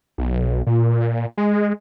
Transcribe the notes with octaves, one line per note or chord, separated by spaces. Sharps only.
B1
A#2
G#3